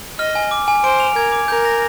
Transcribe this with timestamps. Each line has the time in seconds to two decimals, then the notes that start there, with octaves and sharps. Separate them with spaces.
0.19 D#5 F6
0.35 G#5
0.51 D6
0.68 G#5
0.84 C5 D7
1.00 F7
1.16 A#4 G#6
1.32 D6
1.48 A#4 G6
1.65 A#6